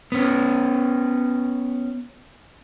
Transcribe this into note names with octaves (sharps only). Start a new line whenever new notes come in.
B3 C#4